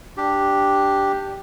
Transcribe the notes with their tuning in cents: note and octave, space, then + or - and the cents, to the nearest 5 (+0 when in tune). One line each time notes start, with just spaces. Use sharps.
D4 +0 G4 +0